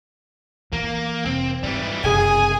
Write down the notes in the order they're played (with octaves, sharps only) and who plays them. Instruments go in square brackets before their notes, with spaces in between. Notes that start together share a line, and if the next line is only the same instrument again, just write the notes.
[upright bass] E3 [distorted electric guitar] A#3
[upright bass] F1 [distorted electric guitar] C4
[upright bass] G#2 [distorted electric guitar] E3 G3
[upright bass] F#1 C3 [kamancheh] G#4 [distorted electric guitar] G#5